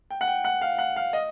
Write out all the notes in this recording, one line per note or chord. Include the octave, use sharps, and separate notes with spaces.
G5
F#5
G5
F#5
F5
F#5
F5
D#5